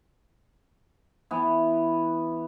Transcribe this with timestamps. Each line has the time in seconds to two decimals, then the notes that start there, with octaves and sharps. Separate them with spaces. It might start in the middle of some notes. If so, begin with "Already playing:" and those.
1.31 E3 B3